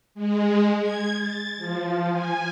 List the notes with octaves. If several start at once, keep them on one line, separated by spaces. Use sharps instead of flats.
G#3
G#6
A6
F3
G#5